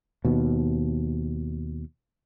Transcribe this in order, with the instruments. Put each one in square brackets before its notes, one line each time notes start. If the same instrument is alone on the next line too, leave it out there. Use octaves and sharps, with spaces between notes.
[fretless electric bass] D#2 B2